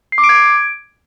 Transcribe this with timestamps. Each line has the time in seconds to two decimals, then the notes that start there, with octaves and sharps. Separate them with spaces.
0.12 C7
0.18 D6
0.24 D7
0.29 G#6
0.35 D7